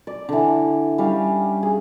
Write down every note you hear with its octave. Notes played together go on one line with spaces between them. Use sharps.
D5
D3 E3
G3 C#4 F5
G#4